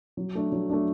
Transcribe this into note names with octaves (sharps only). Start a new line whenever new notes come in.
F#3
A3 D4
F#3
A3 D4